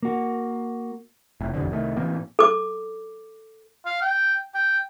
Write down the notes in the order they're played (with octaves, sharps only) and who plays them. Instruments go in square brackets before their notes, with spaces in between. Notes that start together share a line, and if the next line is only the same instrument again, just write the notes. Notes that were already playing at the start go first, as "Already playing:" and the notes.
[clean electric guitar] A#3 F#4
[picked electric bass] F1 A2
E1 A1 F2 D3
C2 D#3 A3
A2 E3 A#3 C4
[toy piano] A4 D6
[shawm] F5
G5
G5